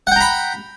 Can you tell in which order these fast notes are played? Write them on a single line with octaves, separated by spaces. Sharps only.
F#5 G5 A#5 B5